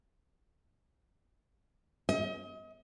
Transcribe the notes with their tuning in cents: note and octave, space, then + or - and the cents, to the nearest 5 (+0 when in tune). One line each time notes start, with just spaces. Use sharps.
D#5 +35